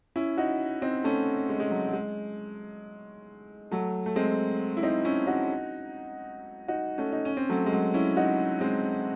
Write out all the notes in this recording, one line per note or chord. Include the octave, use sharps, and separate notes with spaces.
C#4 E4
D#4 F#4
C4 D#4
A3 C#4
G#3
G#3
F#3
F#3
G#3
F#3 A3
A3
G#3 C4
E4
C4 D#4
C#4 E4
D#4 F#4
D#4 F#4
A3 C#4
D#4
C#4
C4
F#3 A3
G#3
F#3
C#4 E4
D#4 F#4
G#3 C4